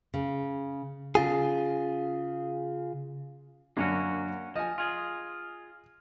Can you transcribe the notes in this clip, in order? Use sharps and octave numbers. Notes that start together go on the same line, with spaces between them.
C#3
C#3 F4 G#4
F#2 D3 A#3 C#4 D4 F#4
F3 D#5 G#5
F4 G#4